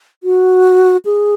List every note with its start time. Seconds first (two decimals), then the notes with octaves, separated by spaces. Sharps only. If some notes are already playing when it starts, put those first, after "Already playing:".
0.23 F#4
1.05 G#4